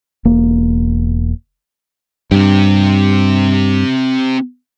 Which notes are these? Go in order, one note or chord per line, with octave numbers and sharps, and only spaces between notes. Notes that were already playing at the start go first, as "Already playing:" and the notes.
E1 A#3
G2 C4 G4